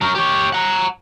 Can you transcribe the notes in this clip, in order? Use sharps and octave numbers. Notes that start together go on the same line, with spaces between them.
F#3 A#4
G4 C#5
F#5 A#5